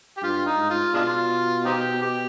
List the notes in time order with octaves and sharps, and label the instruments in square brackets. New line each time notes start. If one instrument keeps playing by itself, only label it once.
[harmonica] G4
[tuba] G2 [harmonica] F4
[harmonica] D#4
[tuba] G#2
[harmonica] F4
[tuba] B2 [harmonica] G#3 D4 F4
[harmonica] C4 D#4 G4
G4